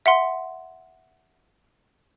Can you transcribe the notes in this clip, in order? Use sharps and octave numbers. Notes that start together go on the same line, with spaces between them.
E5 F#5 C6